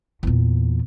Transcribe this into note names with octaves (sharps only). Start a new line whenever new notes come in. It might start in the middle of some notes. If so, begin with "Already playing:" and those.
E2 A#2